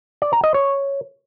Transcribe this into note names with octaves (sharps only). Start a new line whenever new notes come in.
D5
A#5
D#5
C#5